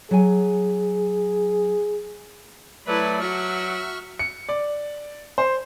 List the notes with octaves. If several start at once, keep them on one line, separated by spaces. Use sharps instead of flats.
F#3 G#4 G#5
F#3 A3 E4 B4 D5 E5
F#4 E5 C#6 F6
C#7
D5
C5